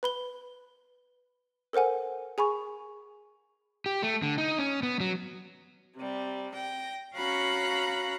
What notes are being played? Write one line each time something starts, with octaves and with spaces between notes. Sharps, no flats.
B4 B5 G7
A4 A#4 C5 F#5 G#5
G#4 G#5 B5 C#6
G4
A3
D3
D#4
C#4
B3
F#3
C3 G3
G5 A#6
C#4 F#4 F5 A#5 B5 F#6